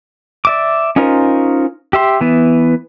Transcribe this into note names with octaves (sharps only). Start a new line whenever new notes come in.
D5 E5 D6
C#4 D#4 F4 A#4 C5
G4 E5 C6
E3 B3